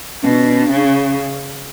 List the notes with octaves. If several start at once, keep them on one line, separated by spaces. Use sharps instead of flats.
B2 C#4
D4
C#4
D4
C#4
D4
C#3 C#4
D4
C#4